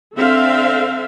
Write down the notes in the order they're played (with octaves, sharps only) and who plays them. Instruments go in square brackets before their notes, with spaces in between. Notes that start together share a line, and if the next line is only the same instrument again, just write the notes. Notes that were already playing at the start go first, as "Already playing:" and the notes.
[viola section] D3 C4 A4 E5 F5